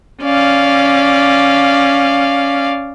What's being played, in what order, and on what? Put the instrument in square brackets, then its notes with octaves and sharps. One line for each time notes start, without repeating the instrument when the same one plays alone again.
[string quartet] C#4 D5 F5